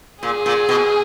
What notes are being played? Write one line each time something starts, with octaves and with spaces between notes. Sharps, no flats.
A#2 G#4
A#2
B2